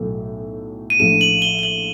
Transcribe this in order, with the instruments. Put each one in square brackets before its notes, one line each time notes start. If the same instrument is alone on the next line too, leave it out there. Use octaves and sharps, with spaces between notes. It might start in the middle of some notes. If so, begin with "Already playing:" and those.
Already playing: [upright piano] B1 A2 F#3 A3
[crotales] D#7
[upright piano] A#1 A2 F3 A3 C#4 [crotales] E7
[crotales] F#7
G7
G7
F#7